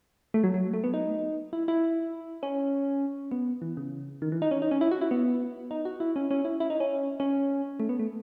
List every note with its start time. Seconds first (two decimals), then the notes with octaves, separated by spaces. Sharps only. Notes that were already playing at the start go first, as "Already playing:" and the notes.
0.34 A3
0.44 F#3
0.54 F#3
0.74 A3
0.84 B3
0.94 D#4
1.53 E4
1.68 E4
2.43 C#4
3.32 B3
3.62 E3
3.77 C#3
4.22 D#3
4.32 E3
4.42 D#4
4.51 C#4
4.62 D#4
4.71 C#4
4.81 E4
4.91 F#4
5.01 E4
5.11 B3
5.71 D#4
5.85 F#4
6.00 E4
6.16 C#4
6.31 C#4
6.45 E4
6.60 E4
6.70 D#4
6.80 C#4
7.20 C#4
7.80 A3
7.89 B3
7.99 A3